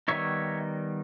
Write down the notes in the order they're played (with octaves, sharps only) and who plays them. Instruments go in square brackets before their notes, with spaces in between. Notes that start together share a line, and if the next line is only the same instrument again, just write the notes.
[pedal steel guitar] D#3 G3 B3 D#4 C#5 E5